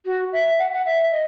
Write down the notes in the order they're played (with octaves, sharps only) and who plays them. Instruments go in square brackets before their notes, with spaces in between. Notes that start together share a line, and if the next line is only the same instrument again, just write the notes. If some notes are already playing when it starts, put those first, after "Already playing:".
[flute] F#4
E5
F#5
F#5
E5
D#5